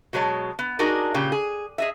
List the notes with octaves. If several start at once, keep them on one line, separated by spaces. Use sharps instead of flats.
B2 F#3 G#3 C#5 A5
B3
D4 D#4 F#4 G#4 A#4 D5
A#2 C#3 G4
G#4
G#4 D#5 E5